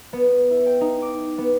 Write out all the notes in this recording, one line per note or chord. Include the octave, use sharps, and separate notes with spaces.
B3
E4
G5
D#4
D6
B3